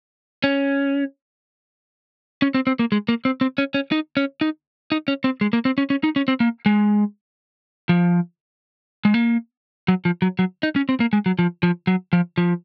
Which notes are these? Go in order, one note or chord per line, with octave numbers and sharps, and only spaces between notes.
C#4
C#4
C4
C4
A#3
G#3
A#3
C4
C4
C#4
C#4
D#4
C#4
D#4
D#4
C#4
C4
G#3
A#3
C4
C#4
C#4
D#4
C#4
C4
A#3
G#3
F3
G#3
A#3
F#3
F3
F#3
F#3
D#4
C#4
C4
A#3
G#3
F#3
F3
F3
F#3
F3
F3